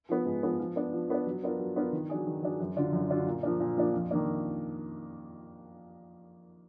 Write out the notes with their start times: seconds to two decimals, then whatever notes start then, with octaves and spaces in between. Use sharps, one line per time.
0.09 F3 B3
0.26 G#2
0.43 F3 B3
0.59 F3
0.76 B3 D4
0.93 F3
1.10 B3 D4
1.27 F#3
1.44 B3 D4 F4 A#4
1.59 F#3
1.76 B3 D4 F4 A#4
1.92 D#3
2.09 F#3 D4 G#4
2.26 D#3
2.43 F#3 D4 G#4
2.60 F#2
2.76 D3 F#3 D4 F4
2.93 F#2
3.09 D3 F#3 D4 F4
3.27 A#2
3.43 F3 A#3 D4
3.60 A#2
3.77 F3 A#3 D4
3.94 F2
4.11 D#3 A#3 D4